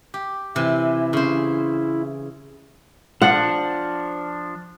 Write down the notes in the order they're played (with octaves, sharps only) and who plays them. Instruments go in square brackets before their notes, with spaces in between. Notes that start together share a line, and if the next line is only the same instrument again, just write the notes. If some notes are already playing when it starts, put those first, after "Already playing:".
[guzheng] G4
[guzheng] C3 E3 [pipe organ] E4
[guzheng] C#3 C5
[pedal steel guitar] F3 D4 [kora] F#5